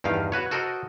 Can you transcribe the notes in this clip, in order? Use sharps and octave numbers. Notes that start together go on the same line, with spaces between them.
E2 G2 D#3 F5
F#4 B4 C#5
F#4 A4 A#4 C5 D#5